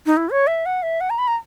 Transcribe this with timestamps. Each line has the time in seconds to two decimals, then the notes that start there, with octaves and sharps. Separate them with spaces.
0.06 D#4
0.17 E4
0.30 C#5
0.47 E5
0.66 F#5
0.83 E5
1.01 F#5
1.10 A#5
1.18 B5
1.28 A#5